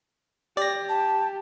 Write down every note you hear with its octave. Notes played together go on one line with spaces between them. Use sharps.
G4 D5 A#6
A5